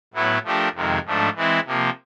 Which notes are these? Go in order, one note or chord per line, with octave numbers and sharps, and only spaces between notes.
A2 F#3 B3 E4
F3 A3 D4 G4 A#4
F2 C3 D#3 G#3
G#2 F3 A3 D4
E3 G#3 C4 E4
C3 F3 A#3